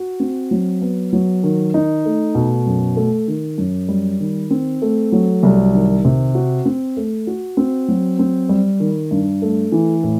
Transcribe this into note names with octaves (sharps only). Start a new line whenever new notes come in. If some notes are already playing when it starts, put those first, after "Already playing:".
Already playing: F#4
C4
F#3
B3
F#3
D#3
D#4
A3
B2
F#2
A3
D#3
F#2
G3
D#3
C4
A3
F#3
C2
D#3
C3
F#4
C4
A3
F#4
C4
F#3
C4
G3
D#3
G2
A3
E3
A2